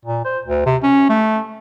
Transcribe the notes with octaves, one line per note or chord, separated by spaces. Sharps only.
A#2
C5
D2
C3
C#4
A3